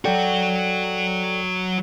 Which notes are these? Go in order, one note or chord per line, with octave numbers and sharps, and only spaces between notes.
F#3 F#4 A4 D5 G5